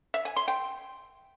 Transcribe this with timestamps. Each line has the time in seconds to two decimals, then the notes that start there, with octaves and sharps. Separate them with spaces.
0.14 E5
0.25 G#5
0.36 C6
0.48 G5